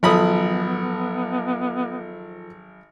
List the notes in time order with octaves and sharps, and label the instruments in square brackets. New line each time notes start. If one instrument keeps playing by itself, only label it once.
[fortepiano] G#1 B5 D#6 [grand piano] F3 A4 [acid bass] F#3 [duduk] B3